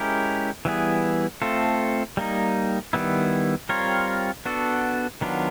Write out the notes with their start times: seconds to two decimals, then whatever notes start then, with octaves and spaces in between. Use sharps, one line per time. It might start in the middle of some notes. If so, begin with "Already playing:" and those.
Already playing: G#3 C#4 E4 G4 A#4
0.65 E3 G3 B3 E4 G#4
1.42 A3 C4 F4 A4
2.17 G3 A#3 D#4
2.93 D#3 G3 B3 E4
3.69 G3 C4 F4 A#4 C#5
4.45 B3 D4 F#4 A4
5.21 D#3 F#3 B3 D4 F4